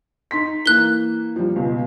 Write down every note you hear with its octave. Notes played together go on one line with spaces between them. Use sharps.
D#4 C6 B6
E3 A#3 F#6 G7
F3 G3
C#2 B2